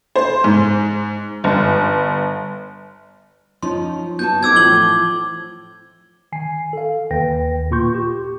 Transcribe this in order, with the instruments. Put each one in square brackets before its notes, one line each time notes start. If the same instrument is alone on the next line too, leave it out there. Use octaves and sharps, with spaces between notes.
[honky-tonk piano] C5
G#2
G1
[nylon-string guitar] F3 C#4 D#4 [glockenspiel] C6
[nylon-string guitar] B3 F#4 A5 [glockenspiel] G6
[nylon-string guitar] C4 D#4 A4 [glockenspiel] D6 E6 G#6
[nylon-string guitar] A2 E3 F3 [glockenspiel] F#7 G7
[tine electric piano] D#3 G#5 C7
A4 F5
D#2 D#3 B4 G5 A#6
A#2 A#3 F4 C6 C#6 G6
G4